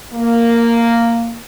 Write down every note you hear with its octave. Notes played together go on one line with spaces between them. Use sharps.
A#3